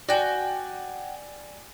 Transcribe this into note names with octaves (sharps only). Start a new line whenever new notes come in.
F#4 D5 G5 G#5